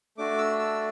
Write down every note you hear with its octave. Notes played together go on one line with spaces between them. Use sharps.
A3 D4 F#4 D6
E6
E6